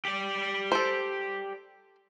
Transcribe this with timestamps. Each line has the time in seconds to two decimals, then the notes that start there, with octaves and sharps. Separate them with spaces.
0.05 G4 D5
0.72 A4 C5